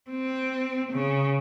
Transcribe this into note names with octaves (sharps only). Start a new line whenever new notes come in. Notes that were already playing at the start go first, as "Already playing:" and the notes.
C4
C#3